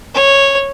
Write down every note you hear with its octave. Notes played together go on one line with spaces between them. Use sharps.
C#5